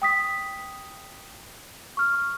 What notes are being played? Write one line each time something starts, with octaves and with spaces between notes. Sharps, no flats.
G5 D#6 B6
C#6 F6